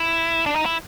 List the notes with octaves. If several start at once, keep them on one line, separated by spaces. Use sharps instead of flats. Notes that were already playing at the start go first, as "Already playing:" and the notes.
Already playing: E4
D4
D#4
E4